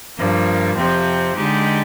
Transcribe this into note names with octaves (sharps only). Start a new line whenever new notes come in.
G2 F3 A#3
F2 C3 F3 C4
D3 G#3 D#4 G4